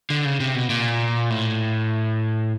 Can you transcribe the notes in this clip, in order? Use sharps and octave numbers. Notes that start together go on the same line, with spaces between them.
D3
C#3
C3
B2
A#2
A2